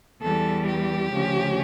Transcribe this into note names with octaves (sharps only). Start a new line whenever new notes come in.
E2 E3 G3 A4
G4
D2 C#3 F3 C#4